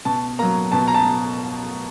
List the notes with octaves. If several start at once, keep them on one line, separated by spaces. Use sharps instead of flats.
B2 A5
F#3 A#3 A#5
B2 A5
A#5
A5